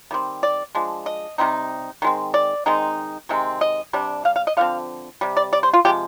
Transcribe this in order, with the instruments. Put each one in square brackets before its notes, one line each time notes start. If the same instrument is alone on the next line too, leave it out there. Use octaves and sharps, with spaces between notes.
[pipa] D#3 G3 C4
D5
F3 G#3 D4
D#5
C3 G3 C4 D#4
D#3 G#3 C4
D5
D#3 G#3 C4 D#4
C3 D#3 G#3 C4
D#5
C3 G3 D4
F5
F5
D#5
D3 F3 C4 F5
C3 G3
D5
D5
C5
F4
C3 F3 G#3 G4